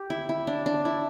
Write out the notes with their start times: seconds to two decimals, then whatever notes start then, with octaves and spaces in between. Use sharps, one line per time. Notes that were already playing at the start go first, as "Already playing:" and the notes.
Already playing: G4
0.10 E4
0.29 E4
0.47 D4
0.66 D4
0.85 E4